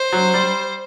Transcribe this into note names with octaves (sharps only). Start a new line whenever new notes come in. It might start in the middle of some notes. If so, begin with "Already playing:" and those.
Already playing: C5
F#3
G3